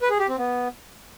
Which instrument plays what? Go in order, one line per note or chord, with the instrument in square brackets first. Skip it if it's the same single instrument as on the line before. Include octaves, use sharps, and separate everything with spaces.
[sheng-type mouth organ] B4
G#4
G4
C4
B3